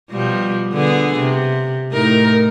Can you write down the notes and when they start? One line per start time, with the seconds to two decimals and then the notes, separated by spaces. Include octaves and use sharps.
0.11 B2 F3 G3
0.73 D3 B3 G#4
1.20 C3
1.92 A2 D#4 A#4